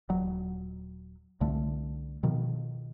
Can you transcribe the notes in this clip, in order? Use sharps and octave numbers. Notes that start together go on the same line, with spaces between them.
D#1 F#3
C2 D3 A3
B2 D#3 F3